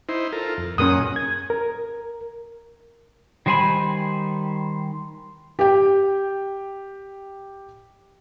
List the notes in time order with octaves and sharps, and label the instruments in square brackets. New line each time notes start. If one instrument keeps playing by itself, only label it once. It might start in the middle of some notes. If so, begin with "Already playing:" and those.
[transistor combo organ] D#4 E4 C5
F4 A4 A#4
F2
[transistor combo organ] F#2 A#2 F#5 [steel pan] C#4 A#4 D#6
[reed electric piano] G#6
A#4
[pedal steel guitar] D#3 G3 C5 G#5 B5
[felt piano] G4 G5